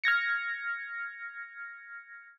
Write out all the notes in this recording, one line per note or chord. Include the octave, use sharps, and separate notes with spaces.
F6 G#6 A#6 C#7